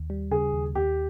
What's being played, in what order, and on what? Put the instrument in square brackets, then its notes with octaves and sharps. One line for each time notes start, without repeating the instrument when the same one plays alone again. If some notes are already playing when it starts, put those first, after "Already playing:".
Already playing: [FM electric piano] D#2
G3
[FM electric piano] C#3 [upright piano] G#4
[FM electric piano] D#2
[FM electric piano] D#2 [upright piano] G4